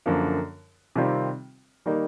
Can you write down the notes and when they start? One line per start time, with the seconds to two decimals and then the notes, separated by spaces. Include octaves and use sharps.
0.06 F#2 D3 F3 A#3
0.96 C3 D#3 G3 C4 F4
1.86 D#3 G3 A#3 D#4